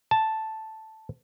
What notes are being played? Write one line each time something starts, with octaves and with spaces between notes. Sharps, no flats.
A5